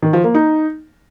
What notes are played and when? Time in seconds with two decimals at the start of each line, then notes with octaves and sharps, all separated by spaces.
0.02 D#3
0.13 F3
0.24 A#3
0.34 D#4